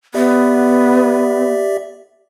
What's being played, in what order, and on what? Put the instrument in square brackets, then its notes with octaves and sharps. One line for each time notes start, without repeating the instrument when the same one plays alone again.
[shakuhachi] B3 [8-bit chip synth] G4 D5 E5